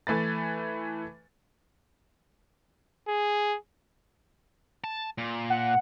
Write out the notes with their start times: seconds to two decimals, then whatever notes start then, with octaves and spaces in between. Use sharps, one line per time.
0.07 E3 A3 B4 A6
3.08 G#4
4.84 A5
5.18 A#2
5.50 F#5